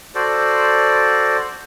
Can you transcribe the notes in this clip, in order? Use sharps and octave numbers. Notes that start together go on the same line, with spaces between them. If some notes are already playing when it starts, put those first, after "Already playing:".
F#4 A4 C5 D5